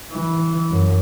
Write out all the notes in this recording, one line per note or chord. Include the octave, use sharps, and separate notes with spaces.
E3
F#2